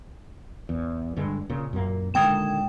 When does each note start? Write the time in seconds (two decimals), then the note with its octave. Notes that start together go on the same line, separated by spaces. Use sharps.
0.69 E2
1.17 G2 D3 G#3
1.49 A#2 C#3
1.73 F#2 A#2 A#3
2.14 A#2 D3 D#3 G#3 G5 E7